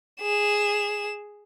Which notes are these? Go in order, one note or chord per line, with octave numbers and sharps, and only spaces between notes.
G#4 E7